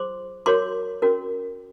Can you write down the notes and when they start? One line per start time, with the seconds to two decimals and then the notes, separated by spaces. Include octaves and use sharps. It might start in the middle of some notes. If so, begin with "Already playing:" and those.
Already playing: F4 G#4 C5 C6 D6
0.46 F#4 A#4 C#5 C6 D6
1.02 C#4 F#4 A#4